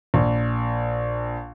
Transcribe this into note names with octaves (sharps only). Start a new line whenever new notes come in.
A#1